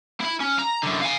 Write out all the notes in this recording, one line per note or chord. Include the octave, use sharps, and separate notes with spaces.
E4 B5
C#4
A#5
F#2 D3
F5 G#5